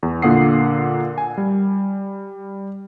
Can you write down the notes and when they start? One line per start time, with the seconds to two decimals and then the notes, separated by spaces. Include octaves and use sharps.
0.03 E2
0.22 A#2 D3 A#3 F#5 D#6 C7
1.18 G#5
1.38 G3